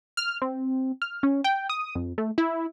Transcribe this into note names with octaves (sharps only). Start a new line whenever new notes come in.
F6
C4
F6
C#4
G5
D#6
F2
A3
E4